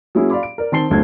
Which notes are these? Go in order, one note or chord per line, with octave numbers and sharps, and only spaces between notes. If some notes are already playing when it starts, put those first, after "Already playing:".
F#3 A#3 C#4 E4 G#4
D5 F5 B5 C6 D6
D7
A#4 D5
D#3 C4 A5 C6 C7 G7
F#1 D2 A3 C4 A5 G#6